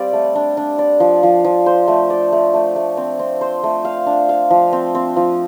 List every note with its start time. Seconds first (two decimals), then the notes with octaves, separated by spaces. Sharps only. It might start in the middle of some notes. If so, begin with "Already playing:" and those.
Already playing: G3 C4 D5 F5
0.13 A3
0.35 D4
0.57 D4
0.79 D5
1.00 F3
1.23 F3
1.45 F3
1.66 C5
1.88 A3
2.10 D5
2.32 A3
2.54 A3
2.76 A3
2.97 C4
3.19 C4
3.41 C5
3.64 A3
3.85 F5
4.07 D4
4.29 F5
4.51 F3
4.73 C4
4.95 C4
5.16 F3